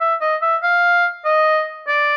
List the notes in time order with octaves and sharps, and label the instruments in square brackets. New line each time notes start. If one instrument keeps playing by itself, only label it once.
[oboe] E5
D#5
E5
F5
D#5
D5